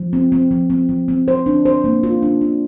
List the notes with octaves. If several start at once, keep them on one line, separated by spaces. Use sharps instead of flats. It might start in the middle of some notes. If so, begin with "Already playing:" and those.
Already playing: F3
C4
C4
F3
C4
F3
C4
C5
D4
C5
A#3
F4
D4
D4